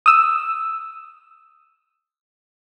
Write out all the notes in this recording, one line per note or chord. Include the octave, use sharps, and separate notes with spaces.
D#6 E6